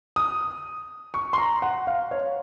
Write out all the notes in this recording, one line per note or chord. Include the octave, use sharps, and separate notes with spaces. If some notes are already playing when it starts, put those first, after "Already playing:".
D#6
C#6
C6
A#5
F#5
F5
C#5